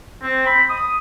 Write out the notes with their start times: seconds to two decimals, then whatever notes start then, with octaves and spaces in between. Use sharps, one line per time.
0.22 C4
0.46 B5
0.69 D#6